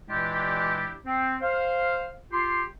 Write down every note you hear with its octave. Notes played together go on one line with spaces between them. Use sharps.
A#2 E3 G#3 D4 E4 G4
C4
C5 F5
F4 G4 C6